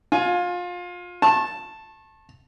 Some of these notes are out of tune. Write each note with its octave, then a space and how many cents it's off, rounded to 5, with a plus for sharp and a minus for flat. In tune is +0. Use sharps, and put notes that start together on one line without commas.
F4 +25 G#5 +15
A5 +0 C#6 -40